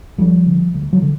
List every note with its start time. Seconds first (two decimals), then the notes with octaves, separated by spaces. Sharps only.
0.18 D2 F3 G3
0.46 D3
0.74 D2
0.93 E3 F#3
1.02 D3